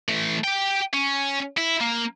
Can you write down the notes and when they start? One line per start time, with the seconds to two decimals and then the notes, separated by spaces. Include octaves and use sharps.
0.09 E3 A3
0.44 G4 G5
0.94 C#4
1.58 E4
1.81 A#3